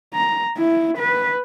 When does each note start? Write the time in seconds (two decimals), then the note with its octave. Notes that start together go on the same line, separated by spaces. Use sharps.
0.13 A#5
0.57 E4
0.98 B4